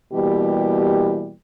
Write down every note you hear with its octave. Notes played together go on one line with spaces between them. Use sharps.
B2 E3 G3 A#3 G4